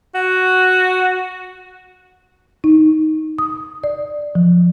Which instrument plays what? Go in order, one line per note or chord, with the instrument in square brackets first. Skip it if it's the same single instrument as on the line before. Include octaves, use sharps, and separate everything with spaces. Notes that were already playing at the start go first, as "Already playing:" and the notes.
[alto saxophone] F#4
[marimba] D#4
D#6
D5
F3